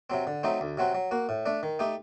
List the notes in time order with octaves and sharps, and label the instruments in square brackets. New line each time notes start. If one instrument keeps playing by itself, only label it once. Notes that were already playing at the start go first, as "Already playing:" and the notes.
[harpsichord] C3 F#3 C4
D3
F#3 A3 C4 D#4
D2
C3 F#3 C4 F#4
F#3
A#3 F#4
A2
A3 D4
D#3
A3 D#4 G4